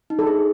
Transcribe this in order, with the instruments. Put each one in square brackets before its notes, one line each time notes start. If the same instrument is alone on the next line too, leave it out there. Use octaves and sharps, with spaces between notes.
[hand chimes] D#4
[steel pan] A4
[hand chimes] G#4